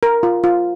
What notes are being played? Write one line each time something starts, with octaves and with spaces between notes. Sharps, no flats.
A#4
F4
F4